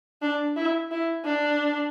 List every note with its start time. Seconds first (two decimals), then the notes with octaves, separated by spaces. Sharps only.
0.22 D4
0.56 E4
0.91 E4
1.25 D4